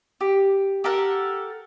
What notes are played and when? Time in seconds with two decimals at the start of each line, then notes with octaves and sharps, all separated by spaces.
0.21 G4
0.84 G4 A4 A#4 F#5